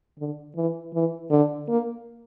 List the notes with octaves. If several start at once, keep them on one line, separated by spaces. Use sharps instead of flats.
D3
E3
E3
D3
A#3